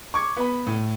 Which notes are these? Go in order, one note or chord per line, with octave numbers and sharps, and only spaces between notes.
C#6 D6 G#6
B3 B5
A2